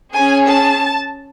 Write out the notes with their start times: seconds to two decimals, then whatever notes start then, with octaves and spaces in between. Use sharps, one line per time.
0.14 C#4 G#4 G#5
0.46 A5